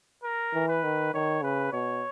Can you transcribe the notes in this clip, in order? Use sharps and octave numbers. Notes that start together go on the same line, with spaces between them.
A#4
E3
B4
D#3
D#3 C#5
C#3 B4
B2 C#5